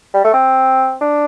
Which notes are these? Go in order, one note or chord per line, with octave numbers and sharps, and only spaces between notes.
G3
A3
C4
D4